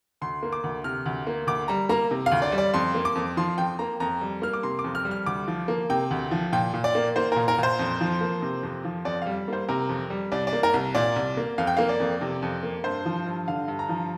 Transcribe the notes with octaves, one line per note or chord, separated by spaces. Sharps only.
D2 C6
A#3
D6
D2
C3 F6
D2
A#3
D2 D6
G3 A#5
A#3 A#5
C3
F5
D2
D5
G3
D5
F2 C6
A#3
D6
F2
F3 C6
F2 G5
A#3 A#5
F2 A#5
G3
A#3 F6
D6
C3 C6
D6
F2
F6
G3
F6
D2 D6
F3
A#3
C3 G5
D2
F3
A#2 G5
A#2
D5
A#3
A#3 C5
A#2 A#4
A#4
A#2 C5
F2
F3
A#3
C3
F2
F3
F2 D5
G3 F5
A#3 C5
C3 A#4
F2
G3
C2 D5
D5
A#3
A#4
C2
A#2 D5
C2
A#3
F2 F5
G5
A#3 F5
D5
F2
C3
F2
A#3
G2 C5
F3
G2
D3 F5
G2
A#5
F3